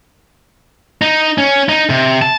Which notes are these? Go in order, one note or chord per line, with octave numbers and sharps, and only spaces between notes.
D#4
C#4
D#4
C3
A5